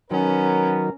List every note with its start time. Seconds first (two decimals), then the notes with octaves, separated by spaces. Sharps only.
0.11 D#3 F#3 B3 C#4 A#4